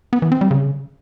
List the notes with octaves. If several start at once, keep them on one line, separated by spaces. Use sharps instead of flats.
B3
E3
C4
G3
C#3